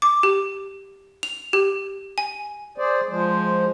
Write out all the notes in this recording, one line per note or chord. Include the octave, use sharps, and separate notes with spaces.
D6
G4
F7
G4
G#5
G#4 C5 D5
F3 G#3 C5